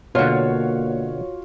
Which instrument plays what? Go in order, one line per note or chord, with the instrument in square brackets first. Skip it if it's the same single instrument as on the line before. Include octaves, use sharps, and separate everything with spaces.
[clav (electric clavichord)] B2 D3 [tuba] A#3 [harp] F4 F#4 [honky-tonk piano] C#5